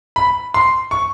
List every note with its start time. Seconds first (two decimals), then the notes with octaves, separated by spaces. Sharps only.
0.16 B5
0.54 C6
0.91 C#6